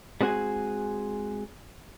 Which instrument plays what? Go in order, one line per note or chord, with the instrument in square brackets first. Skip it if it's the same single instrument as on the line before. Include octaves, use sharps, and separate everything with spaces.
[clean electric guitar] G3 G#3 C4 F#4 G#4 G#5